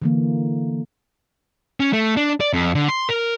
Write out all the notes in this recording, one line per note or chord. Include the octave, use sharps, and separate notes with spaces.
D3 E3 A#3
C#4
A3
D4
D5
F2
D3
C6
A#4